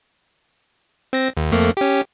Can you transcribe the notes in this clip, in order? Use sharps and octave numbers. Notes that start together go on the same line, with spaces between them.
C4 A#6
D#2
F2 A3 A#3
C#4 G4